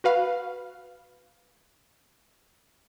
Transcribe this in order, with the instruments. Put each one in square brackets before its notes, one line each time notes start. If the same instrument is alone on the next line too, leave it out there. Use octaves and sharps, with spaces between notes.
[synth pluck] F#4 B4 F5